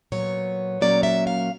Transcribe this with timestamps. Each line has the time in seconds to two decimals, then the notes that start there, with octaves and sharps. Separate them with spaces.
0.12 A#2 F#3 B3 C#5
0.81 A#2 F#3 A#3 C#4 D5
1.03 E5
1.27 F5